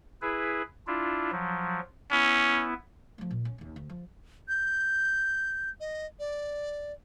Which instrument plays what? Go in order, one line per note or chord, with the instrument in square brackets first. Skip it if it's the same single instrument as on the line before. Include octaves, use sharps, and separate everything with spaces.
[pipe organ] E4 G#4 B4
D4 E4 F4
F3 F#3
[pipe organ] B3 E4 [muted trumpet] C#4
[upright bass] F3 A3
A#2
C#4
D#2 C#4
D2
F3
[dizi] G6
D#5
D5